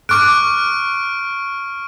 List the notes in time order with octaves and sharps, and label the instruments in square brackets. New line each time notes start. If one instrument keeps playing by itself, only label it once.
[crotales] C#6 F6 D7 [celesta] D6 F#6